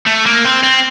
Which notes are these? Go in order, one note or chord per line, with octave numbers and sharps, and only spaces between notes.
A3
A#3
C4
C4